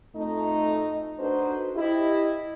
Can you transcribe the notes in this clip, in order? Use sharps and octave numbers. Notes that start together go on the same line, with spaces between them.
F2 A3 D#4
D4 D#4 F#4 A4 B4 C5
E4 G4 D#5